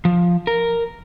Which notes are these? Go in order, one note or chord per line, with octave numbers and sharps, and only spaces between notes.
F3
A#4